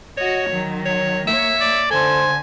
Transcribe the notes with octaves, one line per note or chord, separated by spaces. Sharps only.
F#4 C#5 D#5
D#3 F#3
C#5
A#3 C#5 E5
D5
D3 A4 C5 G#5